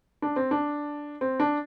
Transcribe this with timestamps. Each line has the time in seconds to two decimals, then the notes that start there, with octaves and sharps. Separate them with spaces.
0.22 D4
0.36 C4
0.51 D4
1.21 C4
1.40 D4